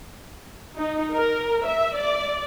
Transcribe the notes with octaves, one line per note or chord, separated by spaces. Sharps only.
D#4
A#4
E5
D5